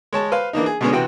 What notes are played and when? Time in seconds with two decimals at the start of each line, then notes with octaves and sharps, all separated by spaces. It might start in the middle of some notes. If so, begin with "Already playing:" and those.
0.13 G#3 C#5 A5
0.32 B4 C5 F5
0.53 E3 A#3 D4 D#4
0.66 G#4
0.81 B2 D3 G#3 B3 C#4 D4
0.93 C3 E3 F#4 G5